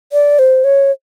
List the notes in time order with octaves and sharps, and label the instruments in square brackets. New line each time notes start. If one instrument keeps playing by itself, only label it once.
[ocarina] D5
C5
C#5